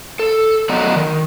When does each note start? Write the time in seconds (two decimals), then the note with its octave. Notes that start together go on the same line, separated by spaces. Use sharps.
0.19 A4
0.69 F#3 B3 D5 D#5 F#5 A#5
0.96 D#3